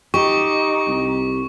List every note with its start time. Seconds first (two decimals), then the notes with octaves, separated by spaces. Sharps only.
0.14 D#4 G4 C#6
0.87 C2